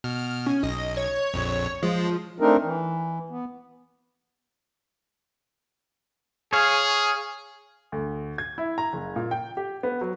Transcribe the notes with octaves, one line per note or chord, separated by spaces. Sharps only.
B2 F6
C#4
B1 D#5
C#5
A#1 F2
F3 G#3
A3 C4 D4 D#4 A#4
E3
B3
G#4 C#5 F5
D2
G#6
E4
A#5
F#1
A#2
G5
G4
B3
F#3